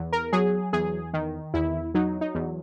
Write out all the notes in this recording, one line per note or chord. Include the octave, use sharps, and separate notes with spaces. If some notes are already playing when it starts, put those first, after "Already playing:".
Already playing: E2
A#4
F#3 G#4
E2 G#4
D#3
E2 E4
F#3 D#4
D#4
E2